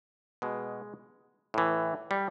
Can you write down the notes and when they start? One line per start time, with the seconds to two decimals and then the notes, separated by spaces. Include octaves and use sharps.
0.42 B2 G#3
1.54 A2 E3
2.11 G3